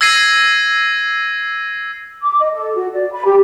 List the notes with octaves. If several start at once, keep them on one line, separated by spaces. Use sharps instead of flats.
E6 G#6 A#6 C7 D#7
D6
D#5
A4
F#4
D5
B5
G4